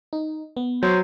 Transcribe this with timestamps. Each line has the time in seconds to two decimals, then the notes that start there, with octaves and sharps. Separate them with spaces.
0.13 D#4
0.57 B3
0.83 F#3 C5